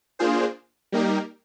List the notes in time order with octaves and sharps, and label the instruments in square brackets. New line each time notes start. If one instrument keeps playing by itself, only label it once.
[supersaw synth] A#3 D4 F4 G#4 C5
G3 A#3 D#4 G4 A#4